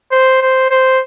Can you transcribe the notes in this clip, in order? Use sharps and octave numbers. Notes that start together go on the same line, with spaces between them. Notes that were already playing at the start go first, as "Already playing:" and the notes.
C5
C5
C5